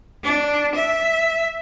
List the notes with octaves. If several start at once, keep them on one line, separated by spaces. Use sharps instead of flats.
D4
E5